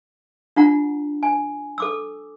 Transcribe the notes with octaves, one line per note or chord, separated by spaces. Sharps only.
D4 F4 F#5 A#5
G#5
A4 D6 E6